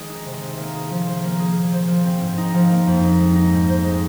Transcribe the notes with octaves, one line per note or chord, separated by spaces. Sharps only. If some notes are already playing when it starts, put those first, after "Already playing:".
Already playing: D#3 G#3 C4 G#4
D#4
C3
C3
A#3
G#4
F3
C5
A#3
G#4
A#2
C5
F3
C4
G#2
D#4
F3
A#3
F2
D#4
G#3
D#4
G#2
C5
G#3